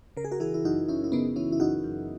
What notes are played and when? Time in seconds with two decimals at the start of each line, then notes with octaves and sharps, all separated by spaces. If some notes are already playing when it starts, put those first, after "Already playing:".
0.17 C#3 A#4
0.24 G#4
0.31 F#4 A#4
0.40 E3 E4 G#4
0.54 E4
0.65 F#2 D#4 F#4
0.88 F#2 C#4 E4
1.04 E4
1.12 C#3 B3 D#4
1.36 E3 C#4 E4
1.52 E4
1.60 F#2 D#4 F#4
1.84 F#2